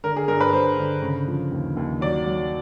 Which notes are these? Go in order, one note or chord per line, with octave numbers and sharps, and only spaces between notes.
D3 A#4
G#4
G2 A#4
B4
G2 C5
D3
C#3
F3
D#2
D#2
F#3 D5
F#3